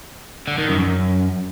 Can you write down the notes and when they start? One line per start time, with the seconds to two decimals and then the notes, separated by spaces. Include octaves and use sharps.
0.48 D3
0.58 D#3
0.69 F#2
0.79 F#2